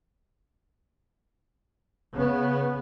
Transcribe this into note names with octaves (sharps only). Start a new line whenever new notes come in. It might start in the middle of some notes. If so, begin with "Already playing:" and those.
C#3 B3